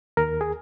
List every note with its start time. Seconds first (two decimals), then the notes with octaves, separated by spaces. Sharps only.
0.17 D#2 A#4
0.41 G#4